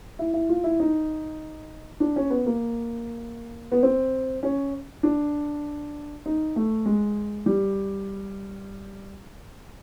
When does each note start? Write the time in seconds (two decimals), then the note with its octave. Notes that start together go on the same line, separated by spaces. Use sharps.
0.19 E4
0.34 E4
0.49 F4
0.64 E4
0.80 D#4
2.00 D4
2.16 C#4
2.30 B3
2.46 A#3
3.72 B3
3.83 C4
4.43 C#4
5.03 D4
6.26 D#4
6.56 A3
6.86 G#3
7.46 G3